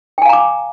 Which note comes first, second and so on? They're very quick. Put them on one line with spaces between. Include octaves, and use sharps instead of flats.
G5 G#5 F5 A#5 D6